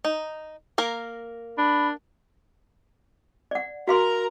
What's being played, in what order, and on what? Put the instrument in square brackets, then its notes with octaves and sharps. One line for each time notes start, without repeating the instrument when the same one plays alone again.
[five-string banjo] D#4
A#3 A#4
[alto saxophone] D4 [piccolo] B5
[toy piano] D5 F#5
[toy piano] F#4 F5 C6 [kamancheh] A#4 A#5